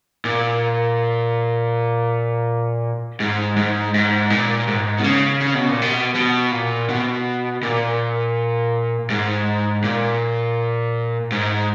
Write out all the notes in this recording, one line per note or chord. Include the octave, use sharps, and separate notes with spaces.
A#2
G#2
G#2
G#2
A#2
G#2
B2
C#3
C#3
B2
A#2
B2
B2
A#2
B2
A#2
G#2
A#2
G#2